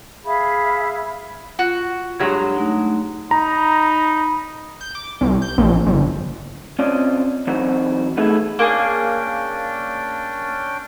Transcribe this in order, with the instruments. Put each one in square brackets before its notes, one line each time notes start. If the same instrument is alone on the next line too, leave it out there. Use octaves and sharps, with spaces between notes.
[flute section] G#4 E5 F5 B5
[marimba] F4 [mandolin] F#4
[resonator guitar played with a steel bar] G2 F#3 G#3 [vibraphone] G4 C#5 [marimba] G#6
[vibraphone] A3 D#4 F#5
[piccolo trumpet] D#4 [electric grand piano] A#5 [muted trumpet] B5
[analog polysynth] G6
D6
C2
G6
A#1
G1
[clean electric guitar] C4 C#4 F4 D5 D#5
E3 F#3 C4 D#4 F#4
A3 B3 D#4 E4 G#4
[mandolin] A#3 G#4 [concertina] C#4 D4 G5